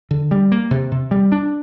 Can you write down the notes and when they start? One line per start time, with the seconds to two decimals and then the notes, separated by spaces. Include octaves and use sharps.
0.11 D3
0.31 G3
0.52 A#3
0.71 C3
0.92 C3
1.11 G3
1.32 D4